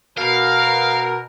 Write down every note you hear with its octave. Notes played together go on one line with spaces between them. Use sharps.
B2 A#4 F5